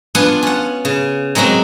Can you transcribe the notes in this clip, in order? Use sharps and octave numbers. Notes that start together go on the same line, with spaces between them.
B3 D4 F4 F#5 G#5
C#4 F#5
C#3
F#3 G#3 A#3 C4 F#4